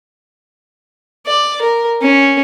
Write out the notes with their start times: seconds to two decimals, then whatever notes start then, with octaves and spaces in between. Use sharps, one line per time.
1.27 D5
1.62 A#4
2.02 C#4